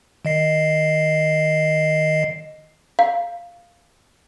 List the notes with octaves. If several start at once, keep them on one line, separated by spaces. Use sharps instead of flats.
D#3 D#5 C7
F5